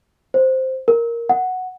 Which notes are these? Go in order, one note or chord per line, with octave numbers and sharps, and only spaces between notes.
C5
A#4
F#5